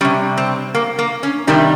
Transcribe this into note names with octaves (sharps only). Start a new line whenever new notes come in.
C3 G3 C#4
C4
A#3
A#3
C#4
C3 D#3 G3 D#4